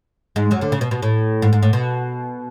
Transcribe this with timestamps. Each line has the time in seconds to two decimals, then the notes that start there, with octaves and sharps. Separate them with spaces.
0.36 G#2 G#3
0.51 F#2 F#3
0.61 D2 D3
0.72 C#3
0.81 B2
0.91 B2
1.02 A2
1.42 G#2
1.53 G#2
1.63 A2
1.73 B2